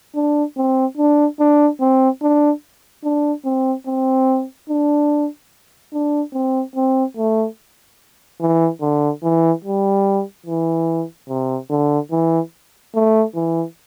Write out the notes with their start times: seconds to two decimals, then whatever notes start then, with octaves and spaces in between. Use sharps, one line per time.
0.15 D4
0.57 C4
0.97 D4
1.40 D4
1.80 C4
2.22 D4
3.04 D4
3.45 C4
3.86 C4
4.69 D4
5.93 D4
6.34 C4
6.76 C4
7.17 A3
8.40 E3
8.81 D3
9.23 E3
9.64 G3
10.46 E3
11.29 C3
11.70 D3
12.11 E3
12.95 A3
13.35 E3